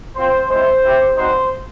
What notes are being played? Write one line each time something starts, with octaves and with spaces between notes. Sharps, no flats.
C4 F4 C5
G#3 C4 E4 C5
C4 E4 G4
G3 C4 D#4 F#4 C5